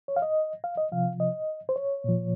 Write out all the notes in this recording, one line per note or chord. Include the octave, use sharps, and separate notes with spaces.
C#5
F5
D#5
F5
D#5
C3 F3 F5
D#5
C5
C#5
A#2 F3